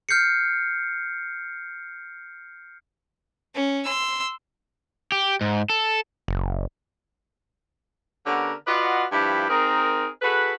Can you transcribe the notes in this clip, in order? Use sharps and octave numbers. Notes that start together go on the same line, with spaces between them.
F6 G6 C7 C#7
C#4
C6 E6
G4
G#2
A4
F#1
D3 B3 C#4 G4 A#4
F4 F#4 B4 D5 D#5 F#5
G2 F3 E4 G4
C4 D#4 G#4 A#4
F#4 G#4 A4 B4